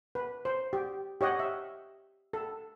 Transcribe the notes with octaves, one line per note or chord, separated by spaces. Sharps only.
B4
C5
G4
G4 C#5 D#5 F#5
E5
A4